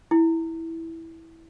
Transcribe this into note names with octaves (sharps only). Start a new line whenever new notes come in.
E4